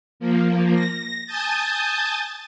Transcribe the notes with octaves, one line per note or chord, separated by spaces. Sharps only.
F3 A#3
A#6
G#5 A5 D#6 G6 A6